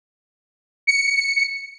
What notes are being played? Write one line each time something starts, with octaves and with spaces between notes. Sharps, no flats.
C#7